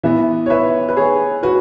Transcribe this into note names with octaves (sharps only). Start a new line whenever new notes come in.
E3 B3 B4 E5
C#5
B4 E5
B4
G#4 C#5
F#4 B4